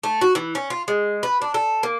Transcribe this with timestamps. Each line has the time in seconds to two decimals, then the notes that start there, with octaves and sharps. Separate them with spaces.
0.03 A3
0.21 F#4
0.35 E3
0.55 C#4
0.70 F4
0.88 G#3
1.23 B4
1.42 D4
1.54 A4
1.83 A#3